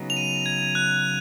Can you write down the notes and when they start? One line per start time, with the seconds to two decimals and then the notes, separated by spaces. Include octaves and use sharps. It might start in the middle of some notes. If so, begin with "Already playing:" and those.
Already playing: C#3 F#3 B3 D#4
0.10 F7
0.17 D#7
0.46 G#6
0.75 F#6